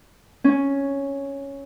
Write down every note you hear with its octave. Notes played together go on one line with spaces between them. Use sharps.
C#4